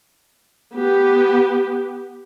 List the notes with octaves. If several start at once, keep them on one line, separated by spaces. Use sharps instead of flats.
B3 G4